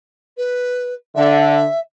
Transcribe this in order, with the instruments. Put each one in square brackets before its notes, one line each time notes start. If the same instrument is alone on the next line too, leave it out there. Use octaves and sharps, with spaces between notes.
[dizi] B4
[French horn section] D3 [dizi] E5